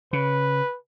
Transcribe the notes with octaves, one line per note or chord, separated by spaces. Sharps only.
C#3 B4